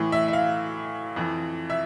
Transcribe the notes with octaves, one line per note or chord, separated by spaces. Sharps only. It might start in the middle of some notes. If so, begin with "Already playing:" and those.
Already playing: A2 E3
E5
E5
F5
F2 E3
E5